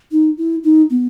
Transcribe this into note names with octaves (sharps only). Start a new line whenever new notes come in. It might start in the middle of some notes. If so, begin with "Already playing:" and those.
D#4
E4
D#4
B3